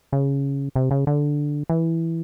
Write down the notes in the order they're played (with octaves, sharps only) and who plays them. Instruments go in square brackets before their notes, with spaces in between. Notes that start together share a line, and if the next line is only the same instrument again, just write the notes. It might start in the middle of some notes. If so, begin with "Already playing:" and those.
[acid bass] C#3
C3
C#3
D3
E3